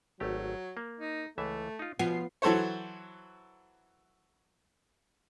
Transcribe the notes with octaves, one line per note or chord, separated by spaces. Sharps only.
G#1 F#3 A3 G4
A#3
D#4
C#2 E3 A3 E5
D#4 F4
B2 F3 B3 F4 G#5 C7
E3 F#3 A4 C5 C#5